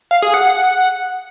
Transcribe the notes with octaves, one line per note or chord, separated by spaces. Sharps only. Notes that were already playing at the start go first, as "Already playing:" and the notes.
F5
G#4
F#5